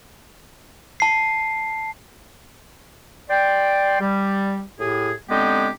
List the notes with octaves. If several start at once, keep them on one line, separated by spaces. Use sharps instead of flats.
A5 C7
D5 G5 C6
G3
A2 G4 G#4
D3 G#3 B3 C4 D#4 G4